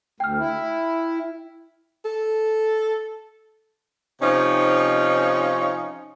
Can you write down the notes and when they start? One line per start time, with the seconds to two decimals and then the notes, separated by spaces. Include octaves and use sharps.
0.20 D2 G5 F6
0.38 E4
2.05 A4
4.21 C3 F3 C#4 D#4